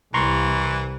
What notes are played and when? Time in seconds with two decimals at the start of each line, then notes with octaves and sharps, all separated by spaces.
0.14 C2 E3 A#5 C6 C#6